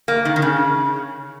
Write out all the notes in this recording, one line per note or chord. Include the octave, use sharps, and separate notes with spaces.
A#3
D#3
D#3
C#3